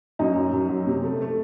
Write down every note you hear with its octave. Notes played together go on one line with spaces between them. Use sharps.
F#2 D#4
F#2
F#2
F#3
C3
A3
A3